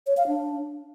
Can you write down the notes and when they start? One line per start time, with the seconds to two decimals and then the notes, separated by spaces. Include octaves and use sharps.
0.07 C#5
0.17 F5
0.27 D4